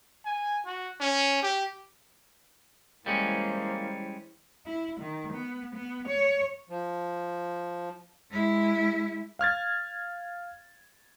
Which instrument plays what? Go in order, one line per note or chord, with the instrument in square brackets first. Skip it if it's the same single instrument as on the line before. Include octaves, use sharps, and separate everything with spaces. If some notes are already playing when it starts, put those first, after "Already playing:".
[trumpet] G#5
F#4
C#4
G4
[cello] E3 C5 [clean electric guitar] G3 G#3 C#4 [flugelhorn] A#3
[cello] E4
D#3
B3
B3
C#5
[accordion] F3
[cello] G#3 E4
[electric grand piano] F5 F6 G#6 A6